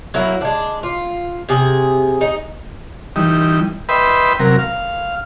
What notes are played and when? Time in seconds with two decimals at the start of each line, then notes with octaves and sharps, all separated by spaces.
0.14 F#3 A#3 E4 A#4
0.41 G#3 D4
0.83 F4
1.49 C3 G#4
2.21 D#4
3.16 E3 G3 D#4
3.89 B4 D#5 E5 G5 B5 C6
4.40 C3 F#3 A#4
4.59 F5